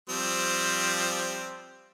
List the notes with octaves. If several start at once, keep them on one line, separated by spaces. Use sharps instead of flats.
F3 G3 C4